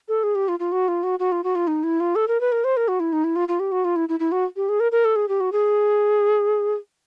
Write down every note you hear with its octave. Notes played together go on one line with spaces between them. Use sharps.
A4
G#4
G4
F4
F4
F#4
F4
F#4
F#4
F4
F#4
F4
D#4
E4
F4
A4
A#4
B4
A#4
C5
A#4
F#4
E4
D#4
E4
F4
F4
G4
F#4
F4
E4
E4
E4
F#4
G4
G#4
A#4
A#4
A4
G#4
G4
F#4
G#4